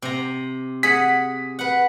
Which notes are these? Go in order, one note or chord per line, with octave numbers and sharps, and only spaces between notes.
C3 A#5
G#4 F#5 B6
B4 F#5